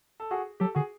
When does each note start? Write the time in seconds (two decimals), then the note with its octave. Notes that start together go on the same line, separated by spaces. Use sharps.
0.20 A4
0.31 F#4 G#4
0.60 F#3 G4 A4
0.75 D3 F#4 G#4